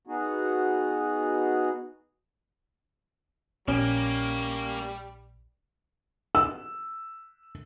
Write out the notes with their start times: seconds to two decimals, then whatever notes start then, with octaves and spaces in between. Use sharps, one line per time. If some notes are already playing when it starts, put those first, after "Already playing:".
0.07 B3 D#4 F#4 G#4
3.68 A#1 G3 A#3 C#4
6.35 E6